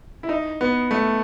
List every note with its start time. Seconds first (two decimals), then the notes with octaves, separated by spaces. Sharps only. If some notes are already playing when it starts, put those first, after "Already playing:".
0.23 E4
0.29 D#4
0.61 B3
0.91 A3